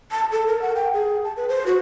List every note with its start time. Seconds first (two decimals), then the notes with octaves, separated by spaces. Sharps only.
0.11 A5
0.32 A4
0.47 A#4
0.62 F#5
0.76 G5
0.94 G#4
1.24 A5
1.37 B4
1.49 C5
1.66 F#4